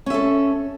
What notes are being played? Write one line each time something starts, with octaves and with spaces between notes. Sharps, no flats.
C#4 A4 E5